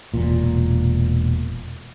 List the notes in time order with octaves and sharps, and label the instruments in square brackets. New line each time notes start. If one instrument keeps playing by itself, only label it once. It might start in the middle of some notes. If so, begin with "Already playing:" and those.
[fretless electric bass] E1 A#2